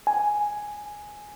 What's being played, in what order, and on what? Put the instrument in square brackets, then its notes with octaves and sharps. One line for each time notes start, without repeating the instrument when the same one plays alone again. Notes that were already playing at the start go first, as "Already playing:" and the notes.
[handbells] G#5